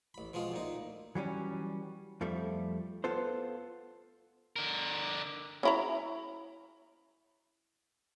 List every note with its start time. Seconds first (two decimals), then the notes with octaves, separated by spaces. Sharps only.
0.14 A1 B5
0.33 B2 F3 G#3 F4
0.52 D2 A#2 D#4
1.15 E3 F#3 G3 C#4
2.21 F2 F3 G3 A3
3.04 B3 F4 A4 C5
4.56 D3 A#4
5.63 C#4 E4 A#5